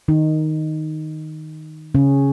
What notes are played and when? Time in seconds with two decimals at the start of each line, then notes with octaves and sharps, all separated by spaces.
0.08 D#3 D#4
1.95 C#3 C#4